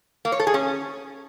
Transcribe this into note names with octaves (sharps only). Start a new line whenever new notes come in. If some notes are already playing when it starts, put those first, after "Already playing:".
A#3
C#5
A4
G#4
C#4